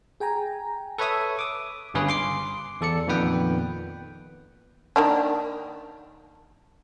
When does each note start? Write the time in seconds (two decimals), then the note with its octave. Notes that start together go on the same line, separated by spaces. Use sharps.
0.20 G#4 G5 G#5 A#5
0.98 A4 B4 C#5 E5 D#6
1.39 D6 D#6
1.94 G1 G2 C#3 C#4 G#4 B4
2.09 C6 D6 C7
2.81 E2 A4 D5 C#7
3.07 F2 A#2 D#3 B3 B4 G5
4.96 D#3 A#3 D4